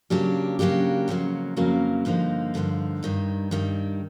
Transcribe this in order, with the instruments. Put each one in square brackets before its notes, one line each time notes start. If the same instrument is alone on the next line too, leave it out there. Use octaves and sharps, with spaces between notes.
[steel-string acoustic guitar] C#3 F#3 A#3 D4 G4
C#3 F#3 A#3 D4 G4
F2 C#3 F#3 A#3
F2 C#3 F#3 A#3
G2 D3 F3 A#3 D#4
G2 D3 F3 A#3 D#4
G2 D#3 G3
G2 D#3 G3